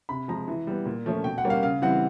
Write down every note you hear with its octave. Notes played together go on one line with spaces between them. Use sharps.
C3 B5
F3 G#3 A#5
E3
G3 B3
A#2
F3 A3 C#4
B2 G5
F#5
G3 A#3 C#4
F5
C#3 F5
E3 G3 C4 F#5